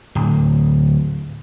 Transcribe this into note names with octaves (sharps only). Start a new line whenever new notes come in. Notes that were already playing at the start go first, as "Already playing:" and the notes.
D1